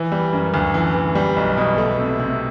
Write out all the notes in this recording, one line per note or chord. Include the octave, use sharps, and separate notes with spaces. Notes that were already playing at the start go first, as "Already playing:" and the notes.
Already playing: E3
G3
F#2
D2
E3
E3
G3
B1
B2
A3
C3
C3